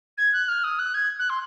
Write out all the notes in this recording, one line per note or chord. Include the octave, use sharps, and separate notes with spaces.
G#6
F#6
F6
D#6
F#6
G#6
F#6
C6